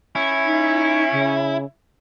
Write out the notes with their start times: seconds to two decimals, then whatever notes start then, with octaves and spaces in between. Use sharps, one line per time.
0.15 C#4 E4
0.45 D#4
1.12 C#3